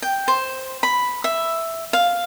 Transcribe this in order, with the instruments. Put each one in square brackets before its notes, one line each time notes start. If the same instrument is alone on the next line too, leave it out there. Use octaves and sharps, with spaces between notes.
[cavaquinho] G5
C5
B5
E5
F5